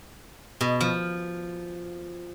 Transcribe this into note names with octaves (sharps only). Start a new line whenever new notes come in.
B2
F3